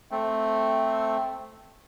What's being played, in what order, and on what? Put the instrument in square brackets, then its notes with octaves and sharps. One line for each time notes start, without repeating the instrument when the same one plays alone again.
[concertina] A3 C4